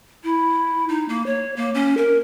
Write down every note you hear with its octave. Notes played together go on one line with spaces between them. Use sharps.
E4
D#4
A#3
C#5
A#3
C#4
A#4